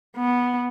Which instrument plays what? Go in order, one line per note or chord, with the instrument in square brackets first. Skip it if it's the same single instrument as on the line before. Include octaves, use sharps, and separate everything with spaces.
[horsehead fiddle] B3